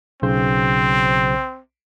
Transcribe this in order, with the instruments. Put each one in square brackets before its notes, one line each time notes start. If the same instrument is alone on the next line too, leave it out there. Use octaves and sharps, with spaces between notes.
[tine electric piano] B1 C#3 C5 [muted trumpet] C4